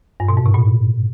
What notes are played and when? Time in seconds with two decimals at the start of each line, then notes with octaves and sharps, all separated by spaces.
0.20 G2
0.29 B2
0.37 G#2
0.46 C3
0.54 A#2